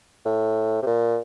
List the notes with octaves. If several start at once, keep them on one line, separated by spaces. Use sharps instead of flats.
A2
C3
A#2